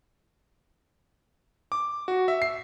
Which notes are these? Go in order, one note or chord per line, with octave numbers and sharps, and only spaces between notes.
D6
F#4
E5
C7